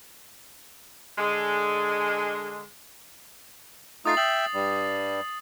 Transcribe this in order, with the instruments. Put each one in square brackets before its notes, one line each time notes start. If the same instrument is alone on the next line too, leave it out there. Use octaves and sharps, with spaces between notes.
[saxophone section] D3 G#3
[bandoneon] A3 D#4 F4 [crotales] D#6 A6 C7
[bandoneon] E5 G5 E6 [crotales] F#7
[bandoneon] G2 G3